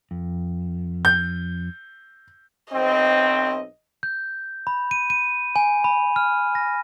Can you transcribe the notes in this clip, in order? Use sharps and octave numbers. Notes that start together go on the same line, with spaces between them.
F2
G6
B1 C4 D#5
G6
B5
D#7
D#7
G#5
B5
F6
A#6